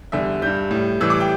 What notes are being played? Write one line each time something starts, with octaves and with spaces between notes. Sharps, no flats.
E2 D3 G3 E5
G2 G3 G6
A2 G3
A2 E3 G3 E6
D6
G5